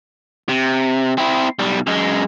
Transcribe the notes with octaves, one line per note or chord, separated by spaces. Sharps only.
C3
C4 E4
B1 G3
F#2 G#3